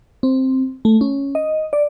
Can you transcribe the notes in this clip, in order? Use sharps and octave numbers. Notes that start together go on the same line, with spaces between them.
C4
A3
C#4
D#5
D5